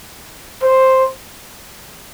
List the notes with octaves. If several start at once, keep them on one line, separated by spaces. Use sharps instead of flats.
C5